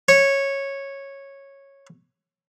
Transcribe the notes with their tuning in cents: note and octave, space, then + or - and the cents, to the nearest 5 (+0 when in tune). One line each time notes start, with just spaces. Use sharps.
C#5 -10